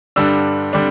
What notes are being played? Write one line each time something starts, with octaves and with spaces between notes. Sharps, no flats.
G2 D3 G3 D4 E6
D3 G3 D4